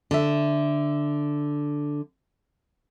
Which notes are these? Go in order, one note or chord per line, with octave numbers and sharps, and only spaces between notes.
D3 E5